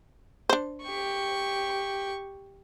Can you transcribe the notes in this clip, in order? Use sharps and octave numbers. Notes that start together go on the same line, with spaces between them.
D4 C5
G4 C#6